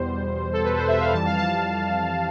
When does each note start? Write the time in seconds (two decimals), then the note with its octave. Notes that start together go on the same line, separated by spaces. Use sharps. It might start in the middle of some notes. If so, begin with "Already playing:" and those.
Already playing: E2 B2 G3 C5
0.53 A4
0.64 B4
0.77 C5
0.88 E5
1.00 F5
1.13 F2 E3 G3 A5
1.25 F5
1.37 A5